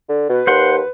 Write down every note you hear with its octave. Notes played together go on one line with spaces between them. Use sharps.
D3
B2 B4
D#2 C5 F#5 C6